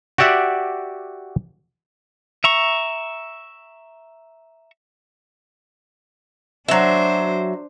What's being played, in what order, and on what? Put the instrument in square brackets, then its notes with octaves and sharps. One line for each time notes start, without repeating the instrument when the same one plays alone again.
[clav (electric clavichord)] F#4 G4 D5 E5 F#5
[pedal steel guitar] E5 A#5 C#6
[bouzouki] F#3 E5 [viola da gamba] D4 C5